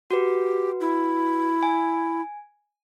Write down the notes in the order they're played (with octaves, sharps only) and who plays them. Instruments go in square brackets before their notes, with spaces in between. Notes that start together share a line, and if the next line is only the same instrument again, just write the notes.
[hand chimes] F#4 B4 [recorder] G4
[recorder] E4
[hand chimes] G#5